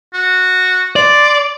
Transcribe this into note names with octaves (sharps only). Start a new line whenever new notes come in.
F#4
D5 C6